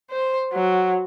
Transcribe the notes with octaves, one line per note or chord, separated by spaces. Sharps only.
C5
F#3